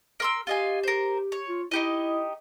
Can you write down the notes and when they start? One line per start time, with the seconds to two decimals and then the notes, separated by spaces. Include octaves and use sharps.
0.20 A#4 C6 E6
0.47 F4 G4 D#5 G#5
0.83 A#4 C5
1.32 C#5
1.49 F4
1.71 D#4 E4 G4 D#5